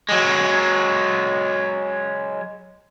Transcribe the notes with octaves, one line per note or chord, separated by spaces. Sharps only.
F#3 G#3